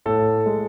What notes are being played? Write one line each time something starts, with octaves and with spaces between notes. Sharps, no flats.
A2 A4
G#3